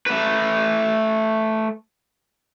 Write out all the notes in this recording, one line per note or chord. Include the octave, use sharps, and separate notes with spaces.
A3 B4